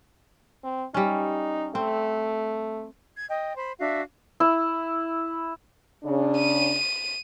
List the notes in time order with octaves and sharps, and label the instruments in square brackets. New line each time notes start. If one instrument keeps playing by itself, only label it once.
[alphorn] C4
[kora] G3 C#4 [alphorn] D#4
[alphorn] A3 [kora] C4
[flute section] G#6
D#5 G5
C5 B5
D4 F#4 E5 F5
[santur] E4
[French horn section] C#3 D4
[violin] D#7